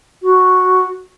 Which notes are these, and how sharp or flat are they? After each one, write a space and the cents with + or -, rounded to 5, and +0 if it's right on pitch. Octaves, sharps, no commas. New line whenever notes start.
F#4 +0